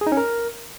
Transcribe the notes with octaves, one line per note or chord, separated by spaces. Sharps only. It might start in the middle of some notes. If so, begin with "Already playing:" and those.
G#4
D#4
C#4
A#4